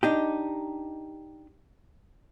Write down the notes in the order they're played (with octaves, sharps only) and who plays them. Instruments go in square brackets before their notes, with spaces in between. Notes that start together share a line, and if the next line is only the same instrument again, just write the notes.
[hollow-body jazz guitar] D4 D#4 G4